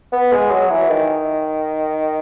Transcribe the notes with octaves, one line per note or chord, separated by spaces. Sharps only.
B3
G#3
F#3
E3
D#3